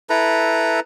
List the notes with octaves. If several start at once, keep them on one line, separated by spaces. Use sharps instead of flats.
E4 A4 B4 A#5